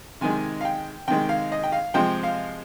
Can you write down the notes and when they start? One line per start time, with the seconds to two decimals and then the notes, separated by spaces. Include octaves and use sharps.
0.21 C3 D#3 G#3 G#5
0.61 F5
0.65 G5
1.08 C3 D#3 G#3 G5
1.29 F5
1.52 D#5
1.64 G5
1.72 F5
1.94 C3 F3 G#3 G5
2.23 F5